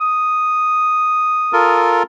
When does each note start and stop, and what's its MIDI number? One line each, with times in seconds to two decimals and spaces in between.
0.01 2.00 87
1.53 2.03 65
1.53 2.03 69
1.53 2.03 70